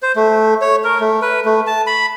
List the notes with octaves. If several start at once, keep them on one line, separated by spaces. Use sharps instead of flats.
C5
A3
C#5
A#4
A3
B4
A3
A5
B5